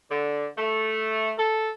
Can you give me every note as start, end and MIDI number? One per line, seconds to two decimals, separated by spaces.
0.11 0.46 50
0.57 1.32 57
1.38 1.71 69